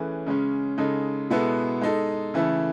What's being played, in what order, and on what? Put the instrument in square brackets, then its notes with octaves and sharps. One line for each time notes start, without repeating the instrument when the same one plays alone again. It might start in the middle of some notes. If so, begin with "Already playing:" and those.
Already playing: [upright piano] E3 A3 C#4 G#4 B4
C#3 G#3 C#4
C#3 G#3 D#4 A4
B2 G#3 B3 E4 A4
G#3 D#4 A4
C#3 E3 A3 E4 A4